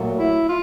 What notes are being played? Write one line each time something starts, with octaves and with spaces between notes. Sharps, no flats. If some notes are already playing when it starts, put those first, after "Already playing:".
Already playing: A#2 F#3 A3
E4
F4